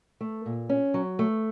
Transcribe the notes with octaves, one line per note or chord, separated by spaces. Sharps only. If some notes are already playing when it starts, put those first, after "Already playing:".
A3
A#2
C#4
F#3
A3